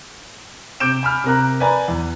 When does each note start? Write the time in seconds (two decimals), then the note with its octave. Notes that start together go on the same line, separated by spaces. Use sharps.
0.80 C3 D6 G6 D7 E7
1.03 G#5 B5 F6
1.24 C3 A#4 F#6
1.60 B4 D5 G#5 A#5
1.88 E2